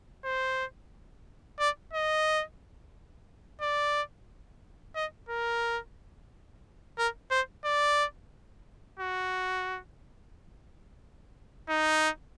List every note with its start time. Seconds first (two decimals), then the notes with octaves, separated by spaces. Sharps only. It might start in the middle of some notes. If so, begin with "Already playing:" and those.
0.25 C5
1.60 D5
1.93 D#5
3.62 D5
4.95 D#5
5.29 A#4
6.98 A#4
7.31 C5
7.65 D5
9.00 F#4
11.69 D#4